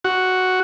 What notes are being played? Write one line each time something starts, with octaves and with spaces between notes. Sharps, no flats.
F#4